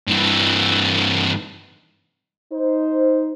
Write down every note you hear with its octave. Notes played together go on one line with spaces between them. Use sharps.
G2 E3
D#4 C5